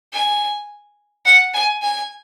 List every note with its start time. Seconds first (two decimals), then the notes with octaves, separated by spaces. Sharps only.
0.13 G#5
1.25 F#5
1.54 G#5
1.82 G#5